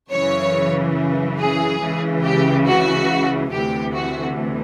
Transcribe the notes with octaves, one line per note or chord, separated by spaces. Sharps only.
F#2 C#3 E3 C#5
G#4
C#2 C#3 E3
G4
F#4
D2 C3 E3 G4
F#4